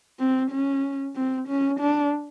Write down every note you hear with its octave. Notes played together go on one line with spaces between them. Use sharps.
C4
C#4
C4
C#4
D4